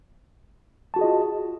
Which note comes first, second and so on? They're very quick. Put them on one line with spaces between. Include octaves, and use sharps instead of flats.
A5 F#4 G#4 D#5 F4